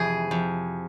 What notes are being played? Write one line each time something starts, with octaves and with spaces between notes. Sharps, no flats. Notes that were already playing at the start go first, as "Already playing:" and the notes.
Already playing: F2 C3 E3 G#4
F2